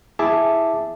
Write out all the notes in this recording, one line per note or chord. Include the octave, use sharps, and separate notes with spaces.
E4 G#4 E5 A5 D6